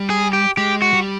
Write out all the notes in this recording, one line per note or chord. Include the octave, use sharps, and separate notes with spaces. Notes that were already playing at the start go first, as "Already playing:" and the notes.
Already playing: G3
G#4
G4
G#3 G4
F#4
G3